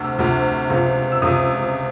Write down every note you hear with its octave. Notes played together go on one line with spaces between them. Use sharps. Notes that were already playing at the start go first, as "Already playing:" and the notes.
Already playing: D2 C3 E6
D2 C3 F3
C#2 C3 F3
E6
C#2 C3 F3 D#6